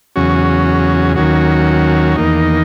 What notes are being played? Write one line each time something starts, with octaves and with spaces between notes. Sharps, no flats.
E2 C#3 F#3 C#4 F#4
D#2 D#3 F#3 C#4 F#4
E2 D#3 A#3 D#4